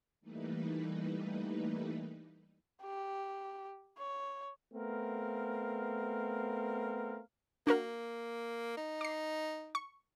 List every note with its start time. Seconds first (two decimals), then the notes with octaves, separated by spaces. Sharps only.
0.21 E3 G3 A3 A#3 D#4 B4
2.82 G4
3.98 C#5
4.74 A3 B3 C4 A#4 F5
7.67 A#3 D4 F#4 A#4
8.77 D#4
9.01 D6 C7
9.75 C#6